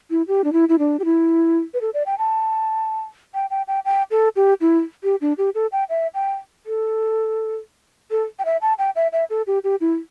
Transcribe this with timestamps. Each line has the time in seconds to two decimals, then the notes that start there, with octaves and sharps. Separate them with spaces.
0.10 E4
0.28 G4
0.44 D4
0.53 E4
0.69 E4
0.79 D4
0.99 G4
1.05 E4
1.74 B4
1.81 A4
1.94 D5
2.06 G5
2.18 A5
3.34 G5
3.50 G5
3.68 G5
3.85 G5
4.11 A4
4.36 G4
4.61 E4
5.04 G4
5.21 D4
5.38 G4
5.55 A4
5.72 G5
5.89 E5
6.14 G5
6.66 A4
8.11 A4
8.39 G5
8.45 E5
8.62 A5
8.78 G5
8.96 E5
9.13 E5
9.30 A4
9.47 G4
9.64 G4
9.81 E4